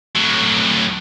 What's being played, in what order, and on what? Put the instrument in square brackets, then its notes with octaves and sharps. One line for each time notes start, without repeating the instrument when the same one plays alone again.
[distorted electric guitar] A2 F#3